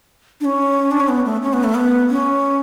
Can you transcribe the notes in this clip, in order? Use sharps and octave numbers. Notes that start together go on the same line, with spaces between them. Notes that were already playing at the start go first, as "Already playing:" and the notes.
D4
C#4
D4
C#4
B3
A3
C#4
B3
A3
B3
C#4